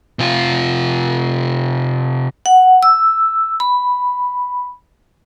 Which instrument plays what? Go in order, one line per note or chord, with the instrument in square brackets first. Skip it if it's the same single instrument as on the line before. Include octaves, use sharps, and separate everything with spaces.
[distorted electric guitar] C3 F4
[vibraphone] F#5
E6
B5